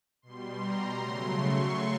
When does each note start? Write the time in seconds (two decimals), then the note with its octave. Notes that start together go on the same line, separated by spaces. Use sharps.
0.22 B2 G3 C6
0.59 A#5
0.96 C#3 F#3 A3 C6
1.33 C#6